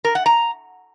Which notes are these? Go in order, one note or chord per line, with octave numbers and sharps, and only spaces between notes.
A#4
F#5
A#5